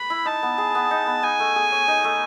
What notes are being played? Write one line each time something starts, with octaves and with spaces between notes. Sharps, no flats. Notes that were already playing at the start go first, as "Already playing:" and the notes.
Already playing: B4 B5
E4
D#4 A5
B3
G#4
B3
D#4
B3
D#4 G#5
A3
G#4
C#5
D#4
A3